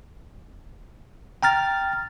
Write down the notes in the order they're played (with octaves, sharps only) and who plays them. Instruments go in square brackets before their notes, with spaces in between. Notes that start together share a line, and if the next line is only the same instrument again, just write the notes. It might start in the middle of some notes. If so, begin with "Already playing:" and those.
[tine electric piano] G5 A#5 F6 A6